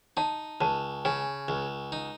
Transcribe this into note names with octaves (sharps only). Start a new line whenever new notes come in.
D#4 A5
C#2 A5
C#3 G#5
C#2
D#4